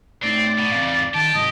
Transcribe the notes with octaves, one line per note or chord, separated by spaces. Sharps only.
A2 A3 C4 D#4 D5
B2
E2 G#2 C#3 C4 F5
D#3 G4 A5
G#2 C3 F#3 D#5